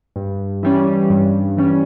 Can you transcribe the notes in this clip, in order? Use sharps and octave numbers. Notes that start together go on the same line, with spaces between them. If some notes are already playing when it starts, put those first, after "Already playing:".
G2
E3 G3 C#4
G2
E3 G3 C#4